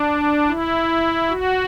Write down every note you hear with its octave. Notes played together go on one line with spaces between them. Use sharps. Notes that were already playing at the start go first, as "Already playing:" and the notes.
Already playing: D4
E4
F#4